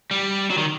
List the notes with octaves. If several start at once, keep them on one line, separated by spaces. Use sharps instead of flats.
G3
F#3
D#3